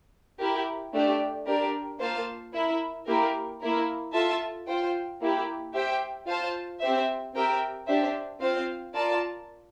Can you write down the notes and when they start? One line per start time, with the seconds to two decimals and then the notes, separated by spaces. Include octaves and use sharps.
0.39 E4 G4 A#4
0.93 A3 D4 G4 D5
1.47 D4 G4 A#4 D5
1.99 A#3 F4 C5 F5 A5
2.53 E4 A#4 E5
3.06 A#3 E4 G4 A#4
3.60 A#3 E4 A#4
4.13 F4 A4 E5 A5
4.67 F4 C5 G5
5.20 A#3 E4 G4
5.73 G4 C5 E5 G5
6.27 F4 C5 F5 A5
6.80 C4 G4 C5 E5
7.34 C4 G4 A#4 E5 G5
7.87 D4 G4 C5 E5
8.40 C4 F4 C5 F5
8.94 F4 A#4 D5 A5